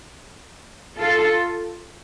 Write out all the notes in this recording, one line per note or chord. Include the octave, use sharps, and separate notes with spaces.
F4 A4